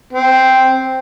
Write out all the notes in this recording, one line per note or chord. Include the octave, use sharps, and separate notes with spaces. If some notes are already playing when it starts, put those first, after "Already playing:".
C4